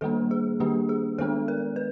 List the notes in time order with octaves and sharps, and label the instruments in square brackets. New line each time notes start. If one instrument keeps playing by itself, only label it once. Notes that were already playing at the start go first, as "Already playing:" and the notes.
[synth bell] D#3 G3 A#3 D4 A4
G#4
D#3 G3 A#3 D4 G4
G#4
D#3 G#3 B3 D4 A4
A#4
B4